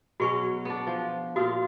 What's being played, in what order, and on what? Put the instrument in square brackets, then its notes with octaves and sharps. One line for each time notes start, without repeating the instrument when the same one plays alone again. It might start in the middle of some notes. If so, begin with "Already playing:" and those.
[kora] B2 F#3 C#4 [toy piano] F#4 G#4 C#6
[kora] B3 D4
F3
[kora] A#2 F3 F4 [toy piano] F#4 D#6